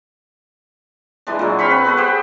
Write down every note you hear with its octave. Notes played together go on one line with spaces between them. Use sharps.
E3 G#3 D4
A#2 F#3
C4 F5 B5 C#6
B4
B3 A4 B4 F#5
G4 G#4 C5